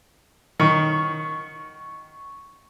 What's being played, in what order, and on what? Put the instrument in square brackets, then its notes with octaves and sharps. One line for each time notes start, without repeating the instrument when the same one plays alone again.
[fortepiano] D#3 [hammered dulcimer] C#6